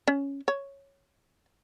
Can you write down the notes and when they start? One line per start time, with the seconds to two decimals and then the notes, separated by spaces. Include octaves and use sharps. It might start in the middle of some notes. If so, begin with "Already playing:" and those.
0.08 C#4
0.48 C#5